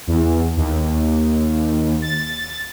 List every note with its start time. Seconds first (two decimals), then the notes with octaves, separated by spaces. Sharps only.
0.07 E2
0.57 D#2
2.02 A6